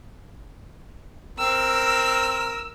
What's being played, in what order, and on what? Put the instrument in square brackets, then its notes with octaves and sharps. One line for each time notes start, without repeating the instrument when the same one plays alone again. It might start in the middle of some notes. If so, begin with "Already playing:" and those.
[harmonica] C4 A#4 [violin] E6